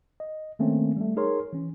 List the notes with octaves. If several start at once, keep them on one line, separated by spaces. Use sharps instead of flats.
D#5
D#3 A3 A#3 C4 C#4
G3 A3
D#4 G#4 A#4 C#5 C6
E3 C#4